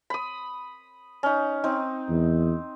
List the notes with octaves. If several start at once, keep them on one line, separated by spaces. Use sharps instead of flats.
B5 D#6
C#4 D#4
C4 D#4
E2